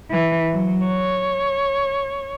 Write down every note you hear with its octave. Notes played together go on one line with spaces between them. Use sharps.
E3
F#3
C#5